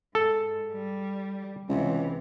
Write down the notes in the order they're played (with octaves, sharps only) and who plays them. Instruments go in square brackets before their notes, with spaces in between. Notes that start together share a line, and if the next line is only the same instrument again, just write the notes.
[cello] G#2 [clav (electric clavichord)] A4
[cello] G3
[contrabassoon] C#2 [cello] C3 E3